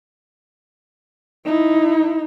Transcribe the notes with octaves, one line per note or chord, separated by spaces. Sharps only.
D#4 E4